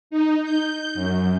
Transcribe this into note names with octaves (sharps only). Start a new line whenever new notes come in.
D#4
G6
F#2